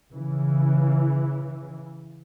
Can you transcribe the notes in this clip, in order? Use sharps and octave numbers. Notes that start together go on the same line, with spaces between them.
C#3 E3